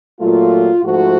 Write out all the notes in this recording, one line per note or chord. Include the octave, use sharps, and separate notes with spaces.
A#2 F#3 A3 F4
G#2 F3 A3 F#4